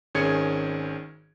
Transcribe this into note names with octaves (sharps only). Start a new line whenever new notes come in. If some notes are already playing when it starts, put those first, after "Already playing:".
G#1 D#3 C#4 G#4 G#6 C#7